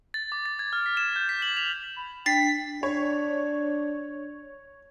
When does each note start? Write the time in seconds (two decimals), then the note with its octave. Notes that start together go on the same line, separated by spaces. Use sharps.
0.14 A6
0.32 D6
0.46 A6
0.59 G#6
0.73 F6
0.86 B6
0.97 E7
1.16 G6
1.29 B6
1.42 F#7
1.57 F7
1.96 B5
2.26 D4 G5 A6 B6 C7
2.83 D4 C#5